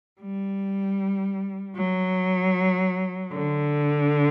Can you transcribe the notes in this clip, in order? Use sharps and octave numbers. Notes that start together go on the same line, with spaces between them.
G3
F#3
D3